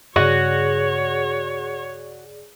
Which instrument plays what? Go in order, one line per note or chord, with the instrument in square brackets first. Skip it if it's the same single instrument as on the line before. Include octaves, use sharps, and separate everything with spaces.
[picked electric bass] G2 C#3 [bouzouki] F#4 [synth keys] G#4 D5 [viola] C#5